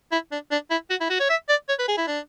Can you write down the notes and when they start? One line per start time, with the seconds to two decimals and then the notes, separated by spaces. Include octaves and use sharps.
0.12 E4
0.32 D4
0.51 D4
0.70 E4
0.90 F#4
1.01 E4
1.10 F#4
1.20 C#5
1.29 E5
1.49 D5
1.69 C#5
1.79 B4
1.88 G#4
1.98 E4
2.07 D4